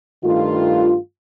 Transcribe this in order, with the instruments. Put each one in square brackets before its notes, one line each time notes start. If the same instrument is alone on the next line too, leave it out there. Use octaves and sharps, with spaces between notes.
[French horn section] G2 D#3 A3 F4